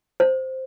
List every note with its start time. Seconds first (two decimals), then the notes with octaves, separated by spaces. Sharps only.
0.20 C5